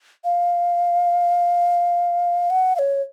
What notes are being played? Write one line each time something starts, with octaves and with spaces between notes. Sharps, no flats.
F5
F#5
F5
C#5